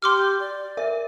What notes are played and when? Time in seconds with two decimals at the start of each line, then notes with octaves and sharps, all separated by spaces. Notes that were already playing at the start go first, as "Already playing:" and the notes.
0.02 G4 C6 D6 F6
0.40 D5
0.77 A#4 E5